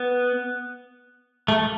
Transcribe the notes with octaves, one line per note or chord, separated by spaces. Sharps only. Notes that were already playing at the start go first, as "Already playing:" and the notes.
Already playing: B3
A3